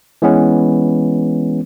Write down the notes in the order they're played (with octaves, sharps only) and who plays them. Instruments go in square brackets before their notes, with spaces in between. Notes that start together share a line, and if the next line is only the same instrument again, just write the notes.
[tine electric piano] E3 G#3 B3 C#4